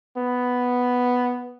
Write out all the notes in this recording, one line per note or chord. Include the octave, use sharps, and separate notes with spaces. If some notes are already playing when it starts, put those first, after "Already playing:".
B3